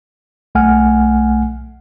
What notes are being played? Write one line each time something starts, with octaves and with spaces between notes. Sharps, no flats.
B1 A3 F#5 G#5 F6